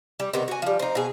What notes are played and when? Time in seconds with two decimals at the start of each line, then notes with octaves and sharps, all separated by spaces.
0.20 G3
0.33 C3 D#3 B3
0.48 F#4 G#5
0.62 F3 G3
0.79 C4 D#4
0.95 B2 G#4